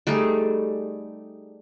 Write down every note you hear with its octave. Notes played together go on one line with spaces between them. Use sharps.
G3 A3 D#4 G#4